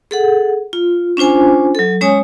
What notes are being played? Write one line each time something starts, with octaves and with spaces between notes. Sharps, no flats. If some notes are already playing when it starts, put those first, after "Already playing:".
G#4 A4 F#5
F4
C#4 D4 F4 C5 G#5
F#3 A4
G#3 C#4 C#5 G#5 D#6